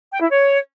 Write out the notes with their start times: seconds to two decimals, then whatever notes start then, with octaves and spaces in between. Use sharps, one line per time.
0.12 G5
0.21 E4
0.29 C#5